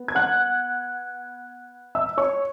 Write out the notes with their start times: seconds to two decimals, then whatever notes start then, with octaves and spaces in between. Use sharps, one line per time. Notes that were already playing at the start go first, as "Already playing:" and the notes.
Already playing: B3
0.08 G#6
0.15 F#5 F#6
1.95 E5 E6
2.17 C#5 C#6